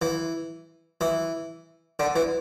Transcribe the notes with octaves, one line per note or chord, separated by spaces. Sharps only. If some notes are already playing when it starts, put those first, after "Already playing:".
E3
E3
D3
E3